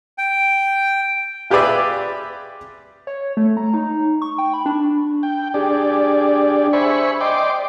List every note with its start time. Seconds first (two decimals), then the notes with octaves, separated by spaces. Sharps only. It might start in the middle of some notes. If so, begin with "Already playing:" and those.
0.18 G5
1.50 F4 G4 G#4 B4 D5 E5
3.07 C#5
3.37 A3
3.57 A#5
3.74 D#4
4.22 C#6
4.38 G5
4.54 B5
4.66 D4
5.23 G5
5.54 D4 G4 G#4 D5
6.73 C5 E5 G#5 B5 C#6
7.21 D5 D#5 G5 C6 D6